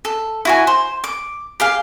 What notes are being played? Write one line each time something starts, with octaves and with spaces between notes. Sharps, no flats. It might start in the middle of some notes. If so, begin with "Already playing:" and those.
A4
E4 F#4 G#5
C5
D6
G4 G#4 F5